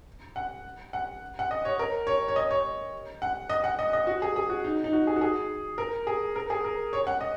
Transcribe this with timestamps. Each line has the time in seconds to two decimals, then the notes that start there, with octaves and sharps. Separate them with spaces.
0.36 F#5
0.93 F#5
1.39 F#5
1.51 D#5
1.65 C#5
1.79 A#4
2.07 C#5
2.28 C#5
2.36 D#5
2.51 C#5
3.22 F#5
3.49 D#5
3.64 F#5
3.79 D#5
3.93 D#5
4.07 F#4
4.22 G#4
4.36 G#4
4.49 F#4
4.64 D#4
4.84 D#4
4.93 F#4
5.07 G#4
5.16 F#4
5.21 G#4
5.78 A#4
6.07 G#4
6.36 A#4
6.50 G#4
6.64 A#4
6.93 C#5
7.07 F#5
7.21 D#5